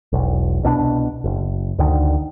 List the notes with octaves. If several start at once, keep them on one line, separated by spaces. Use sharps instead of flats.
E1 B1
C2 B2 D3 D4
F#1
D2 D3 D#3